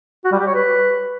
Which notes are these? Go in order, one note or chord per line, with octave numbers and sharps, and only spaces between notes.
F#4
G3
G4
C#5
B4